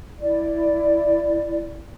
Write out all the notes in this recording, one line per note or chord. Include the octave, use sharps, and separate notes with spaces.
E4 D5